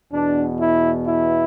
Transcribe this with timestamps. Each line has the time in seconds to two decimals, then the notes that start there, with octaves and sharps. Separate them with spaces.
0.13 E2 B2 B3 D4
0.59 E4
1.06 E4